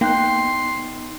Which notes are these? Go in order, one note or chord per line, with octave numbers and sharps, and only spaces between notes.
A#3 B3 D#4 G5 C6 F#6 G6